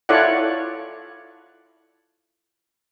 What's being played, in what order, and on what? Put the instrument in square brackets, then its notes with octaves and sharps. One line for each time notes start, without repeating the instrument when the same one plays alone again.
[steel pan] E4 F4 A4 C#5 D5 F#5